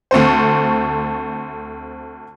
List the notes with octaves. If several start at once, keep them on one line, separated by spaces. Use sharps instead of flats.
D2 A3 C4 C5